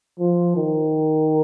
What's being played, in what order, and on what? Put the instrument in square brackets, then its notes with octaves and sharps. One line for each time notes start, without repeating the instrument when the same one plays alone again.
[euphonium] F3
D#3